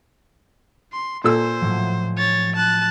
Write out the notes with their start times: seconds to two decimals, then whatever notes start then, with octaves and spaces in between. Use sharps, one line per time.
0.93 C6
1.24 A#2 A4 C5 E6
1.61 A2 F3 F#3
2.18 C#5 A6
2.56 A5 F#6